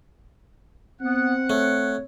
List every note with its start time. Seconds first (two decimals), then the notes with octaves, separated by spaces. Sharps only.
1.01 B3 C4 F#5
1.50 A3 C#5